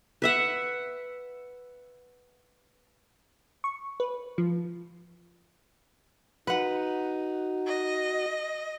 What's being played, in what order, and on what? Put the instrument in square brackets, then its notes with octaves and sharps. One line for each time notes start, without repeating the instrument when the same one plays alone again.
[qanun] B4 E5 F#5
[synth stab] C#6
B4
F3
[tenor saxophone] D#4 [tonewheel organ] F#4 [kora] B4 F#5
[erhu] D#5